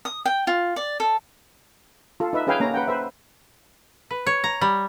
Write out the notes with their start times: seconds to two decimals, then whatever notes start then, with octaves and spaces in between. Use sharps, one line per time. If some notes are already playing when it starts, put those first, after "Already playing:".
0.05 D#6
0.26 G5
0.47 F4
0.76 D5
1.00 A4
2.20 F4 A4
2.33 D#4 B4 E5
2.47 C#4 G#4 B4 F5 G5 G#5
2.60 A#3 C#4 A#5
2.74 B4 F#5 G5
2.87 B4 C5 E5
4.11 B4
4.27 C#5
4.44 A#5
4.61 G3